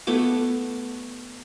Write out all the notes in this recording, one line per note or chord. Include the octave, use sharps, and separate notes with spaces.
A3 B3 D6